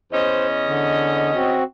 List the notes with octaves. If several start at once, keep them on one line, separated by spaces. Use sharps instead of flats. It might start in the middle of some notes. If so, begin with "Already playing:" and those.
E2 C#4 C5 D#5
D3
C4 F#4